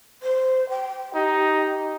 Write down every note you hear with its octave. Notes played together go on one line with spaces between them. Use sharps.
C5
G5
D#4 G4